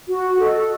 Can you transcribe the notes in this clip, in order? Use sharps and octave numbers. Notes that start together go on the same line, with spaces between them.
F#4
A4 D#5